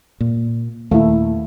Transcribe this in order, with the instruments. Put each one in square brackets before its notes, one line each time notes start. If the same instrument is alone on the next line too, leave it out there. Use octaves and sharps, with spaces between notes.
[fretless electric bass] A#2
[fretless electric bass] D#2 A#2 [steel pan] A3 E4